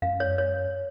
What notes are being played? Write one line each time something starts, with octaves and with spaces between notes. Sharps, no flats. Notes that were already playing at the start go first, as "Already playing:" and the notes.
F#2 F5
C#5
C#5